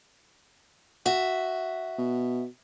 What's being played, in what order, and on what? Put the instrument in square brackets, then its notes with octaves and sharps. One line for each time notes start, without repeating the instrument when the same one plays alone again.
[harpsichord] F#4 [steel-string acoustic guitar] E5
[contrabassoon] B2